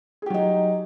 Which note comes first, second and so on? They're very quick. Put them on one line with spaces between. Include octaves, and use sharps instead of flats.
G#4 G4 F#3 D#4